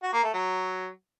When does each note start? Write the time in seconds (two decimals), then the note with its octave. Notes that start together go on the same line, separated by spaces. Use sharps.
0.03 F#4
0.13 A#3
0.23 A3
0.34 F#3